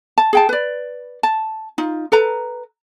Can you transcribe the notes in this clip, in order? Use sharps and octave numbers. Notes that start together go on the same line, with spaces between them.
A5
G#4 G5 A5
B4 D5
A5
D#4 F4
A4 B4 A#5